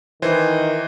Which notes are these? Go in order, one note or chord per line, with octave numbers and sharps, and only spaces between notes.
D#3 E3 C5